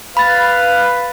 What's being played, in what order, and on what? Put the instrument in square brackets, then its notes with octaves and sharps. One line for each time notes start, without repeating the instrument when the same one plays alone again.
[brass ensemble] B4 [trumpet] F5 [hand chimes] B5 A6